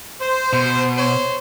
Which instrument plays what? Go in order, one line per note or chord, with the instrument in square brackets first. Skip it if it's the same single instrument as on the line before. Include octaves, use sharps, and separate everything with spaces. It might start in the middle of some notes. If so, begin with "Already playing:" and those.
[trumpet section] C5
[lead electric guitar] B2
[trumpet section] C5 C#5